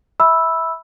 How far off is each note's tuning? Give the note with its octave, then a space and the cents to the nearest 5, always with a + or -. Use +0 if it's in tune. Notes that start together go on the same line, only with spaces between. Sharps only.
E5 -20 B5 -5 E6 +0